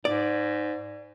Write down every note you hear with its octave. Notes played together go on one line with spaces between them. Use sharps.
G#2 D5